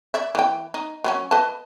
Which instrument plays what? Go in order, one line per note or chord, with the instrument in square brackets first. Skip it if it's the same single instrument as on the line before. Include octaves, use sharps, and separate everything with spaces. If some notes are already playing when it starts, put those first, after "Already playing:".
[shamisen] D5 E5
E3 G5
D#4
F#3 B3 C#4
B4 D#5 A5